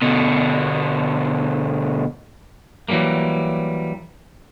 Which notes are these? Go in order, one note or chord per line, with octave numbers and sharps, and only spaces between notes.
B2 D3
E3 F#3 G3 A3 A#3